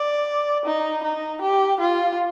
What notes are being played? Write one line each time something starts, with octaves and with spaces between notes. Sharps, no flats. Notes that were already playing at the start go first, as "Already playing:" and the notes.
Already playing: D5
D#4
D#4
G4
F4